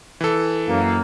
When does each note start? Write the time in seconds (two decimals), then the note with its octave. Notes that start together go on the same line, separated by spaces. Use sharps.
0.21 E3 A4
0.67 F#2 A#3